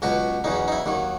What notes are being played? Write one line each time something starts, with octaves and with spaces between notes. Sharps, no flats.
C#2 B2 F#3 F#4
E2 C#3 F#3 D#4
D#4
E4
D#2 D#3 F#3